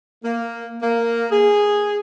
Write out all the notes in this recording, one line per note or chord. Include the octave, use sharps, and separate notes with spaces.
A#3
A#3
G#4